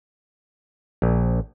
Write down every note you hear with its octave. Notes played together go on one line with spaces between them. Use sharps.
A#1